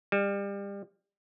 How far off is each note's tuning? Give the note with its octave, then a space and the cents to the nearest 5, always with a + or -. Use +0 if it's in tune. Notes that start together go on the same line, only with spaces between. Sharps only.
G3 +30